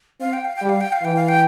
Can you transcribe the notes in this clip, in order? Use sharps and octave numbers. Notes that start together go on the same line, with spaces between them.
C4 F5
G5
F5
G5
G3
F5
G5
F5
E3 G5
F5
G5